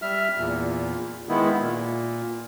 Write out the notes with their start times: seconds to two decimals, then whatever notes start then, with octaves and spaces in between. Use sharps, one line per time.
0.02 G3 E5 F6
0.37 E2 A#2
1.29 D#3 G#3 B3 E4
1.60 A#2